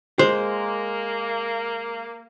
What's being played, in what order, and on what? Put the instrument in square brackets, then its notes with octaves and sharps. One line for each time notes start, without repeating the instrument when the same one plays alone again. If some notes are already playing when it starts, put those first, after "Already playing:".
[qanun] G#3 [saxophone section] A#3 [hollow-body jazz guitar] C5